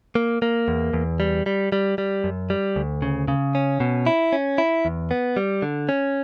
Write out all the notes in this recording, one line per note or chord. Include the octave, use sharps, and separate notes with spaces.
A#3
A#3
E2
E2
G3
G3
G3
G3
F#2
G3
D2
C#3
C#3
C#4
B2
E4
C#4
E4
E2
B3
G3
D3
C#4